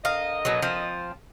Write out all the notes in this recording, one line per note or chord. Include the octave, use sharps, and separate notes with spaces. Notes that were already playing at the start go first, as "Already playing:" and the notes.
D3 A#4 D#5 F5
B2 F#3
F3 C4